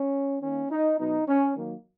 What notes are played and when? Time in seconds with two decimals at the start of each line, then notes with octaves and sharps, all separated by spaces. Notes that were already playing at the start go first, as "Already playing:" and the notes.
Already playing: C#4
0.43 D#3 A#3 C#4
0.71 D#4
0.99 B2 F#3 B3 D#4
1.27 C#4
1.55 D#3 F#3 A#3